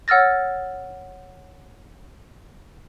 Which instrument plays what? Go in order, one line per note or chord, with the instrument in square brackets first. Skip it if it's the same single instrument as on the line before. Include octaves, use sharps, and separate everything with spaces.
[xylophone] C#5 F#5 E6 F6 A6 A#6